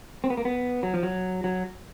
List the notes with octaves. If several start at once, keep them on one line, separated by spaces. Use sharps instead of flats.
C4
B3
A#3
B3
F#3
F3
F#3
F#3